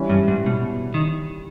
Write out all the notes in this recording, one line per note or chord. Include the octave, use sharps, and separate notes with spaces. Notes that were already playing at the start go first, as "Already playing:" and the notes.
Already playing: E3 G3 C#4
G2
G#2
B2
D#3